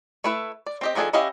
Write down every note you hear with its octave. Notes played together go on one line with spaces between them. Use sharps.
A3 E4 B4
D5
C4 G4 D#5
D#3 F3 D4 G#4 A4
C#4 E4 G4 D#5 F5